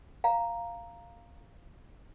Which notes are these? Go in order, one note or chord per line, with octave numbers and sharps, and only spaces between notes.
F5 A#5